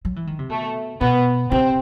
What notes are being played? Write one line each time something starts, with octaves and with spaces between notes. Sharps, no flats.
F#3
E3
D#3
C3
B2 A3
B2 B3
C3 C4